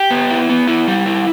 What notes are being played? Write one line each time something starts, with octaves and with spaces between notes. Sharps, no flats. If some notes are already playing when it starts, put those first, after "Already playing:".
Already playing: G4
B3
E4
B3
E4
G3
E4